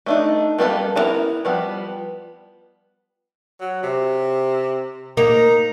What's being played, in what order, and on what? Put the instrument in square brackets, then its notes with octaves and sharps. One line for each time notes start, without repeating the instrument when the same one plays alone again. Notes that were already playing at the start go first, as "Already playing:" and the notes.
[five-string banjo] A3 D4 D#4
G3 A#3 B3 F4 A4
B3 D4 E4 A#4 A#5
F3 G3 B3
[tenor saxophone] F#3
C3
[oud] A#3 [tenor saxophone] D#4